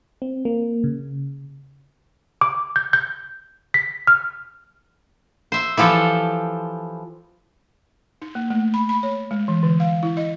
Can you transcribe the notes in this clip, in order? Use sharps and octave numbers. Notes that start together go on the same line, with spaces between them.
C4
A#3
C#3
D6
G6
G6
B6
F6
C5 E5
E3 F3 G4 A4
D#4
A#3
A3
B5
B5
C#5
G#3
E3
D3
F5
E4
D#5